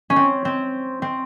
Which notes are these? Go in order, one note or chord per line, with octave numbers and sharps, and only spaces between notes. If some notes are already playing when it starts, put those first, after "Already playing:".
C#4
C4
C4
C4